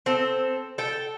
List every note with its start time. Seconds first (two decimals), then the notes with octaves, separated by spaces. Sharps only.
0.06 C4 A4
0.78 A4 G5